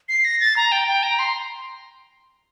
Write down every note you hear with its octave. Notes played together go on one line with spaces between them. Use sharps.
C7
A#6
A6
A#5
G5
G5
A#5
C6